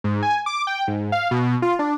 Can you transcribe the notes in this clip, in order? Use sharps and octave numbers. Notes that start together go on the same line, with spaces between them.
G#2
G#5
D6
G5
G#2
F5
B2
F4
D4